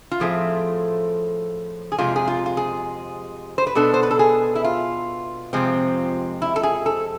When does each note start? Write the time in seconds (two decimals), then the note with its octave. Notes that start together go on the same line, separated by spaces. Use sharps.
0.11 F4
0.20 A2 F3 A3 C4 G#4
1.92 G#4
1.98 F2 C3 G#3 F4
2.16 G#4
2.28 F4
2.46 F4
2.57 G#4
3.58 C5
3.67 B4
3.75 B2 B3 D4 A4
3.94 C5
4.03 B4
4.11 A4
4.19 G#4
4.55 E4
4.64 F4
5.53 F2 C3 F3 G#3 C4
6.42 E4
6.56 A4
6.63 G#4
6.86 A4